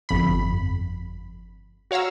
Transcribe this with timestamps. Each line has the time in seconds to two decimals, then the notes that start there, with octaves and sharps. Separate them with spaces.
0.09 G1 F2 B5
1.91 F#4 C#5 F5 A#5 E6